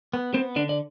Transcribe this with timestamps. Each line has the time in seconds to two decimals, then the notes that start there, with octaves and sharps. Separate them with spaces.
0.14 B3
0.34 B3 C4 C5
0.56 D3 D4 D5
0.69 D5